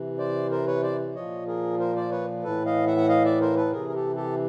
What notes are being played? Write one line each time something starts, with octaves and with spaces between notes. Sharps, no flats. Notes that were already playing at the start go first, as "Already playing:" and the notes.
Already playing: C3 E3
C5 D5
A#4 C5
B4 C#5
C5 D5
A#2 F3 C#5 D#5
G#4 A#4
A#4 C5
C5 D5
B4 C#5
A2 E3 A4 B4
D#5 F5
E5 F#5
F#5
D#5 F5
D5 E5
A#4 C5
A4 B4
C3 E3 G#4 A#4
A#4
G4 A4
G4 A4